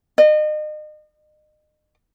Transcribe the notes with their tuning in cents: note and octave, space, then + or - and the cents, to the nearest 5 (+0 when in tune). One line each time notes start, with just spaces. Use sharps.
D#5 -35